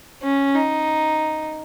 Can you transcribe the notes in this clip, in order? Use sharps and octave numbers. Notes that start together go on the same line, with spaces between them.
C#4
D#4